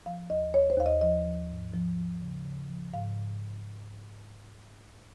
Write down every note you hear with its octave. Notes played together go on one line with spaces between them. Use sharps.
F3 F5
D#2 D#5
D#2 C#5
C5
D#2 F5
D#5
F3 D#5
F3
G#2
F3
F3
C#3
C#3
F3
G#2 F5
G#2